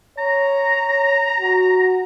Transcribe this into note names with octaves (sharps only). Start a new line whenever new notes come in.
C#5 A#5
F#4